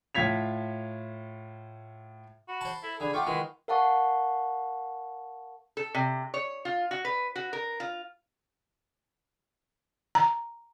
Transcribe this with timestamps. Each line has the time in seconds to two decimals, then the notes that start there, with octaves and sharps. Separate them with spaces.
0.15 A2 F4 G#6 B6 F7
2.48 F#4 B5
2.61 C5 A5
2.83 E4 A4
3.00 D3 G#4 B5
3.14 A3 F4 F#5 G5 C#6 D6
3.27 D#3 G#3 E4 F4 B4
3.68 A#4 F5 F#5 A5 C#6
5.77 A4
5.94 C3
6.34 C#5
6.65 F4
6.91 F#4
7.05 B4
7.36 F#4
7.53 A#4
7.80 F4
10.15 A#5